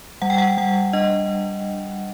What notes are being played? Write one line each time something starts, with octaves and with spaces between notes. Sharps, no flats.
G3 F#5
G5
F#5
G3 F#5
D4 D#5